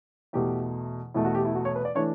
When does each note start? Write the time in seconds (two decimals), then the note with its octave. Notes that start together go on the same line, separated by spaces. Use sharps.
0.33 E2 B2 A3 G4
1.14 E2 B2 A3 E4
1.25 F#4
1.35 G4
1.45 E4
1.55 F#4
1.65 C#5
1.76 B4
1.85 D5
1.95 E3 A3 D4 C#5